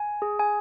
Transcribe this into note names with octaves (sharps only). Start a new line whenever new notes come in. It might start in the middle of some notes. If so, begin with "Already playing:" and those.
Already playing: G#5
G#4
G#5